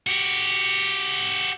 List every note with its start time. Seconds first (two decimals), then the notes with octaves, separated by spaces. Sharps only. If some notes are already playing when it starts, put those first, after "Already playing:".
0.07 F#4 G4